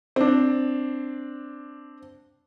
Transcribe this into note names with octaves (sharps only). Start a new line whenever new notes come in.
C4 D4